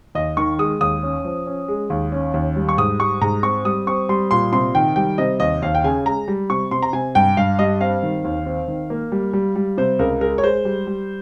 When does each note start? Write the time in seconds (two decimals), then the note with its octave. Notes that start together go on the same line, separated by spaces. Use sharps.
0.15 D#2 D#5
0.37 D#3 C#6
0.59 G#3 D#6
0.81 D#2 D#6
1.03 C#4
1.25 F3
1.46 C#4
1.68 G#3
1.90 D#2
2.12 C#4
2.34 D#2
2.56 G3
2.69 C#6
2.78 G#2 D#6
3.00 G3 C#6
3.21 G#2 A#5
3.43 C4 C#6
3.65 G3 D#6
3.87 C4 C#6
4.09 G3 C6
4.31 A#2 C6
4.53 C3 C6
4.75 D#3 G5
4.96 G3 G5
5.18 C3 D#5
5.40 D#2 D#5
5.62 D#2 F5
5.75 G5
5.84 C#3 G#5
6.05 G#3 A#5
6.28 G3
6.50 C3 C#6
6.71 C3 C6
6.82 A#5
6.93 C3 G#5
7.15 G2 G5
7.37 G2 F5
7.58 G3 D#5
7.81 C4 F5
8.03 D#3
8.25 D#2
8.46 C4
8.68 D#3
8.90 A#3
9.12 G3
9.33 G3
9.56 G3
9.78 C3 C5
9.99 C#2 A#4
10.21 G#3 A#4
10.38 C#5
10.43 G#3 C5
10.65 G3
10.87 G3